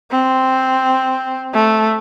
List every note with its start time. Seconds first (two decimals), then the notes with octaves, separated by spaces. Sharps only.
0.12 C4
1.54 A3